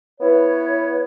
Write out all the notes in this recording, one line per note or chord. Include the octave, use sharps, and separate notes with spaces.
B3 E4 B4 C#5